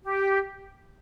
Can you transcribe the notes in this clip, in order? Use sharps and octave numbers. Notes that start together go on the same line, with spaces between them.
G4